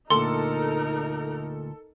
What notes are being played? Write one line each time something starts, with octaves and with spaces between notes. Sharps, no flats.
D2 A#2 D#4 A4 A#4 C6